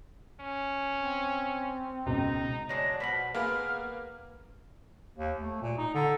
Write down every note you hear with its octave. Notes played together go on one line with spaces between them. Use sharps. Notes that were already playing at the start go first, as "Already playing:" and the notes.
C#4
C4
C#2 B2 D#4
F#3 G#3 D4 A#6
B2 F3 F#5 B6
G#3 A#3 B3 B4 F6
D#2
A3
A#2
D#4
D3